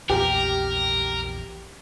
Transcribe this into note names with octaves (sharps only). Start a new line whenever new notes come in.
A#1 E2 G4 A#4